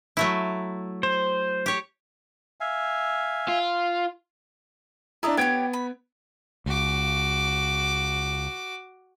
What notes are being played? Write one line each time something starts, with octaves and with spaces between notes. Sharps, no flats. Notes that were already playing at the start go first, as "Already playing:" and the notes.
F#3 A3 E4
C5
G4 C#5
E5 F5 G#5
F4
D4 E4 D5 D#5 A#5
B3 G4 C#5 G5 G#6 D7
B5
C#2 F#4 D6